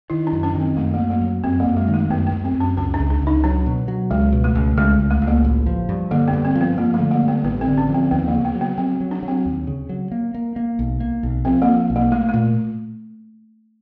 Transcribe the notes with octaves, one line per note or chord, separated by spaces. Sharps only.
D#3 E4
D4
F#2
C#4
D#3
C4
F#2 A3
A#3
F#2
A#3
F#3
F#2 C4
A#3
F#2
G#3
D#3
A3
F#2 B3
B3
F#2
C4
F#2
C#4
C#2 C#4
D4
C#2
D4
C#2 D#4
F#3 D4
B2
F#3
C#2 G#3
B2
A3
C#2
C#2 G#3
C#2
A3
C#2
A#3
A1
F3
G2
D3 A#3
B3
G2
C4
F3
B3
F3 A#3
A3
D3
A#3
G2
B3
A1 B3
C4
D3
C#4
F3
C4
D#2 B3
A#3
C#3
B3
F#3
B3
F#3 C4
F#3
D4
F#3
C4
D#2
C#3
F#3
A#3
A#3
A#3
B1
A#3
B1
F3 C4
A#3
F3
B1
A#3
A3 A#3
A3
A#2